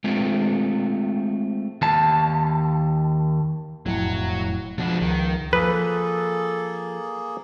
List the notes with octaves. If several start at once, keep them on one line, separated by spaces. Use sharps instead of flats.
G#3 A3 C4 F4
D#2 A5
E1 F2 A2 F#3 E4
C#2 B2 F3 D4
C#2 D#3
F3 A#3 G#4 A4 B4